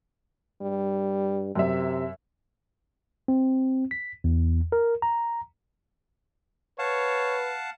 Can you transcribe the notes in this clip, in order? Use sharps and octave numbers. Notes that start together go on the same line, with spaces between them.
G2 G3
F#2 C3 E5
C4
B6
E2
A#4
A#5
B4 C#5 F5 F#5 A5